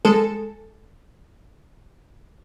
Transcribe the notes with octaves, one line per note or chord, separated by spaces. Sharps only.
G#3 A4